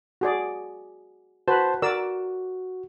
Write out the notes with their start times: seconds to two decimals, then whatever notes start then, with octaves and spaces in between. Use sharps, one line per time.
0.21 F#4 G#4 D5
1.48 F#4 B4 C5 A5
1.82 F#4 A#4 D5 E6